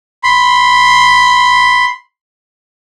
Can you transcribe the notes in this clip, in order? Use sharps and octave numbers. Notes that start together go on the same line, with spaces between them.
B5 C6